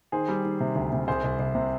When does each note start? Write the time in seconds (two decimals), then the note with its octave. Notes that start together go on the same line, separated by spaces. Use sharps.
0.12 D#3 G#4 C5
0.28 G3
0.45 D#3
0.60 C3
0.75 D2
0.92 C3
1.08 C2 G#4 C5
1.24 C2
1.39 C2
1.55 C3